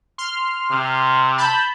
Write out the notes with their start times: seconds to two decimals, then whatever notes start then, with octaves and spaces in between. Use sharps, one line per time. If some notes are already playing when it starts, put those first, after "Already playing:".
0.18 C6 F6
0.71 C3
1.38 A5 B5 G6